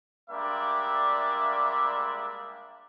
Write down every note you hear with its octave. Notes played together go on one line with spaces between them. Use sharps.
G3 G#3 A#3 D4 D5 E5